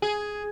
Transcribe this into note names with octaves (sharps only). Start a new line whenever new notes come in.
G#4